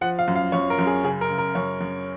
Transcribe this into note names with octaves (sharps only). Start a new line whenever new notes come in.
F3 F#5
F5
F#2
F5
F#2 C#5
A#4
F#2
G#4
C#3 G#4
A#4
C#3
A#4
F#2 C#5
F#2